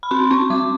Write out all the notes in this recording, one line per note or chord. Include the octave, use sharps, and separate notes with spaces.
B5
C4 C6
C4 C#6
G3 D6